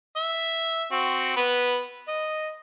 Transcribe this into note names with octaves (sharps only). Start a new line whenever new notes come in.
E5
C4 F#4
B3 B4
D#5